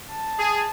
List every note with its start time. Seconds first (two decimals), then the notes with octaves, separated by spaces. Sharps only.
0.10 A5
0.38 G#4